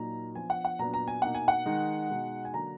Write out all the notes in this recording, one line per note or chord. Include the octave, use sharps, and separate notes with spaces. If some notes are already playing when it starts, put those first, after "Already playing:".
Already playing: A#2 F#3 A#3 D#4 A#5
F3 B3 D4 G#5
F#5
F#5
A#2 F#3 B3 D4 A#5
A#5
G#5
B2 A#3 D#4 F#5
G#5
F#5
D#3 G#3 D#4
B2 G#3 D#4
G#5
D3 F#3 A#3 D4 A#5